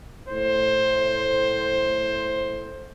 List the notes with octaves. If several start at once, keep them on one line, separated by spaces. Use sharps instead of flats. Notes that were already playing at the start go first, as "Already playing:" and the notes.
A2 C5